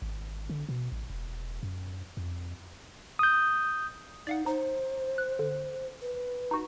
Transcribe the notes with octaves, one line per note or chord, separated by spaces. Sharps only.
G#1
D3
B2
A1
E1
F#2
F2
D#6 G6
D#4 D5 F5 F#5
D#4 C5
F#6
D3
B4
D#4 F#4